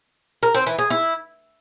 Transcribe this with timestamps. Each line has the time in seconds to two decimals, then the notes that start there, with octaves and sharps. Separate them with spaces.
0.43 A#4
0.55 C4
0.66 E3
0.78 G#4
0.90 E4